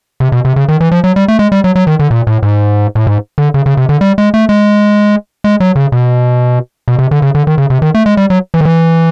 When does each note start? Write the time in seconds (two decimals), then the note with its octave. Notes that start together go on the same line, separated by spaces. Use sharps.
0.20 C3
0.32 B2
0.45 C3
0.56 C#3
0.68 D#3
0.81 E3
0.91 F3
1.04 F#3
1.16 G3
1.28 A3
1.39 G#3
1.52 G3
1.64 F#3
1.75 F#3
1.87 D#3
1.99 D3
2.11 A#2
2.27 A2
2.43 G#2
2.95 A2
3.07 G#2
3.38 D3
3.54 C#3
3.66 C#3
3.77 C3
3.89 D3
4.01 G3
4.18 G#3
4.34 A3
4.49 G#3
5.44 G#3
5.60 F#3
5.76 C#3
5.92 B2
6.88 B2
6.99 C3
7.11 D3
7.22 C#3
7.35 D3
7.47 D#3
7.58 C#3
7.70 C3
7.82 D#3
7.95 A3
8.06 G#3
8.17 G3
8.30 F#3
8.54 E3
8.61 D#3
8.65 E3